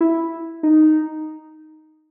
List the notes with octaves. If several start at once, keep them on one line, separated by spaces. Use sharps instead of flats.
E4
D#4